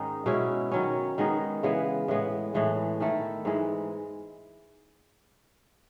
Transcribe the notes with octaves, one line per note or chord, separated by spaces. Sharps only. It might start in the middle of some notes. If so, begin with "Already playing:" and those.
Already playing: G#2 D#3 G#3 C#4 D#4
B2 G#3 C#4 E4
D#3 F#3 C#4
D#3 G#3 B3 D#4
C#3 E3 G#3 B3
A2 E3 G#3 B3
A2 E3 G#3
D#3 A3 E4
G#2 E3 G#3